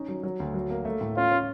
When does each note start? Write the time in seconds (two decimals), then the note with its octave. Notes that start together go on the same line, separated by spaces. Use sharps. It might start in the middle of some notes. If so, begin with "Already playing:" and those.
Already playing: C#4 D#4
0.08 F#3
0.23 F#3
0.40 D2
0.54 F#3
0.70 A#3
0.85 A3
1.01 A2
1.16 C#4 F4
1.31 C#4